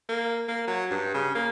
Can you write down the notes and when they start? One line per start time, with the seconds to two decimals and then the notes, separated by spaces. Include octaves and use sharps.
0.09 A#3
0.48 A#3
0.67 F#3
0.91 G2
1.14 C#3
1.35 A#3